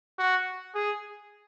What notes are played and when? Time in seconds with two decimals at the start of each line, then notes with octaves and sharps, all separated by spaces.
0.19 F#4
0.75 G#4